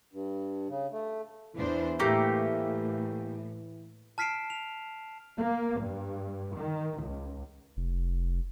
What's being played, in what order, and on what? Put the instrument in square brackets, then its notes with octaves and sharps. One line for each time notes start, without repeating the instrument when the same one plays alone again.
[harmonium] G2
C#3
A3
[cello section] E2 D4 C5 [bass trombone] E3
[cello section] A2 [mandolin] A3 A#3 G4
[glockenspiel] A5 F6 B6 C7 D7 E7
F7
[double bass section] A#3
G2
D#3
C#2
[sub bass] F1